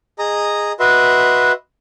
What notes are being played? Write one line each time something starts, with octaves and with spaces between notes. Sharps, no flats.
G#4 D#5 A#5 D#6
F#4 B4 D#5 E5 C6